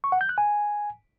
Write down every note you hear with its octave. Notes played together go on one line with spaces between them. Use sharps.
C#6
F#5
G6
F#6
G#5